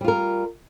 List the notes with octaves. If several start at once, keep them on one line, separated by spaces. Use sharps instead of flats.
G3 F4 A#4